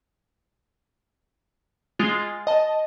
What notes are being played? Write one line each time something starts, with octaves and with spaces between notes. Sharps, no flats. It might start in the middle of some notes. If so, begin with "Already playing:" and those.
G#3 F4
D#5 A5